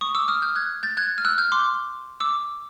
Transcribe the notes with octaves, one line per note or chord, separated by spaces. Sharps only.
C#6 D#6
D6 E6
D#6 F6
F6 G6
F#6 G#6
G6 A6
F#6 G#6
F6
E6 F#6
F6 G6
C6 D6
D6 E6